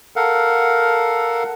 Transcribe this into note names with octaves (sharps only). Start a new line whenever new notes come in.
A4 A#4 F5 F#5